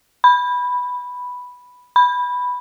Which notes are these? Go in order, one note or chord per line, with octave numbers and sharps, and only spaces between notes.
B5
B5